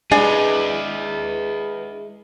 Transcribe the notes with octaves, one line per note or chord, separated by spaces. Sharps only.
G#3 D4 E4 G#4 B4 G#5